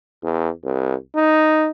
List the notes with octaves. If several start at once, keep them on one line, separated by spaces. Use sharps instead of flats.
E2
C2
D#4